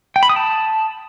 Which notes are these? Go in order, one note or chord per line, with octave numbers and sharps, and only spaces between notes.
G5
B5
D#6
A5